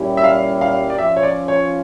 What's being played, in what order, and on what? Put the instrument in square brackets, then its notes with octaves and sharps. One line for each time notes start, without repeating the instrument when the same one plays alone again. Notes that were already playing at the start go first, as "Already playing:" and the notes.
Already playing: [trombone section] A#2 G3 C#4 E4 G4
[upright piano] E5
F5
F5
D5
[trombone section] F3 C#4 F4 [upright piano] E5
[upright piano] C#5
D5
C#5